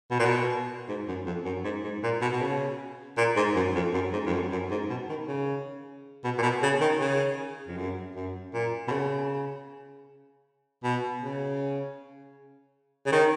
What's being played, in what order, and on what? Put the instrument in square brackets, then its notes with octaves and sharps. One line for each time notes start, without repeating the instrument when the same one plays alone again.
[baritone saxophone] B2
A#2
B2
G#2
F#2
F2
F#2
G#2
G#2
A#2
B2
B2
C#3
A#2
G#2
F#2
F2
F#2
G#2
F2
F#2
F#2
G#2
B2
D#3
C#3
B2
A#2
B2
C#3
D#3
C#3
F2
F#2
F#2
A#2
B2
C#3
B2
C#3
C#3
D#3